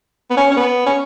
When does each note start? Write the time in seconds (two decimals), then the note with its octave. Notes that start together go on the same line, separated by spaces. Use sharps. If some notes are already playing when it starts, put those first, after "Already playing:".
0.30 B3
0.36 C#4
0.51 C#4
0.56 B3
0.86 C#4